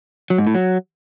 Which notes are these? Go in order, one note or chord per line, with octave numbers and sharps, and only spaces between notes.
F#3
G#2
A2
F#3